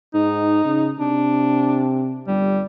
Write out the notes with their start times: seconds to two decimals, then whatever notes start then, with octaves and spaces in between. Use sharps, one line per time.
0.14 G#2 D#4
0.65 C#3
0.99 C3 D4
2.27 G1 G3